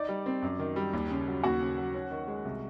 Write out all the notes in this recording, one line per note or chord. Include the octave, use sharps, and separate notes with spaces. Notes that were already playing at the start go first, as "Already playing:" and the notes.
Already playing: D#4 D5
G3
C4
F#2
D#3
G3
D#2
C#3
F#3
D#2 F#4 F#5
C#3
F#3
C#4
D#3
G#3
C2